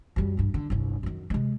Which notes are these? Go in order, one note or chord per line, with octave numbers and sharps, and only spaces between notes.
F#2 G3
B1 G2
D3
G1 C2
F#2 D#3
C3 G#3